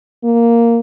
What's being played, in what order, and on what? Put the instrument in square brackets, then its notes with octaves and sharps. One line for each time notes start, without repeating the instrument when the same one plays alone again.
[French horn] A#3